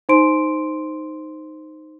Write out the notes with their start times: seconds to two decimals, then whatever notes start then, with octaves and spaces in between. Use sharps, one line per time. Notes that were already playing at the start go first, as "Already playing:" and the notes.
0.09 D#4 C5 C6 D7